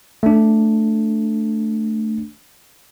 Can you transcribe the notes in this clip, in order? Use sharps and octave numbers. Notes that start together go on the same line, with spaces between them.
A3 D4